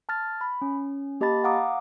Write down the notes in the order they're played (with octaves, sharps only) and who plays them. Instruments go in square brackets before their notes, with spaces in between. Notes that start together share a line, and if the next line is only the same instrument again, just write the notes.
[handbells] A5 F6 A6
B5
C#4
A#3 G4 D#5 A5 B5 A6
F5 F#5 A#5 D6 D#6